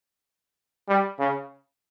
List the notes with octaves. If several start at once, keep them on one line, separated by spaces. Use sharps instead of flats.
G3
C#3